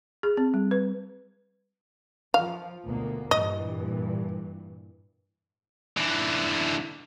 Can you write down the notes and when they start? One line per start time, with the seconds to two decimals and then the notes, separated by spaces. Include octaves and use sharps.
0.23 G#4
0.37 C4
0.54 G3
0.71 B4
2.34 F3 F5
2.85 D2 B2 A#3
3.31 G2 A#2 E3 D#5
5.97 D3 E3